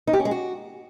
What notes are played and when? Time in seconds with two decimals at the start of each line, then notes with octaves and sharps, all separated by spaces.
0.07 D#4
0.13 G4
0.19 C#4
0.25 G#3
0.31 F#4